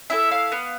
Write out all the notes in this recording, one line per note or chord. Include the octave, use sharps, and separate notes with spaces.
E4 A4 E5
F5
B3